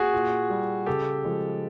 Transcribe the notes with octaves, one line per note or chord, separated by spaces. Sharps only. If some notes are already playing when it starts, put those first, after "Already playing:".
Already playing: F#4 G#4
A#2
G3
C#3 G4 A4
F3 G#3